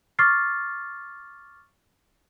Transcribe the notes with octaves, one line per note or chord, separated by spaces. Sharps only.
C#6 D6 F6 A6 C7